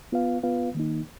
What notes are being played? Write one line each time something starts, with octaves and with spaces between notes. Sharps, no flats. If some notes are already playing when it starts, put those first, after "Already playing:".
B3 F4 B4 F5
B3 F4 B4 F5
D#3 A#3 D#4